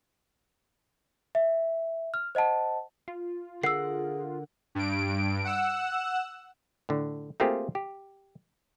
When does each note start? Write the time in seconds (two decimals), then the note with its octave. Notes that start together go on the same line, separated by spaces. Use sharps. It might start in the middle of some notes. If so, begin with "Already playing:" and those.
1.35 E5
2.14 F6
2.35 C5 D#5 F#5 A5
3.08 F4
3.63 D3 G#4 A#4 F#5 E6 C7
4.75 G2 D7
5.45 F#5 E6
6.89 A2 D3
7.40 A3 A#3 C4 F4 G4 G#4
7.75 G4